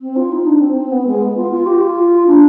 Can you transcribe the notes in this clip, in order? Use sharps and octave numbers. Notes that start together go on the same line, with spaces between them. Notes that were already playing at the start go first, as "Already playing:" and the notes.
C4
F4
D#4
D4
C4
C4
B3
G#3
B3
F4
F4
G4
F4
D4